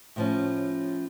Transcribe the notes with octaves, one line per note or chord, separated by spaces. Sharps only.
A2 F3 C#4